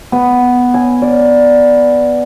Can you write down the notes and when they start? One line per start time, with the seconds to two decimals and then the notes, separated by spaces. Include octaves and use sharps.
0.12 B3
0.74 G#5
1.02 D5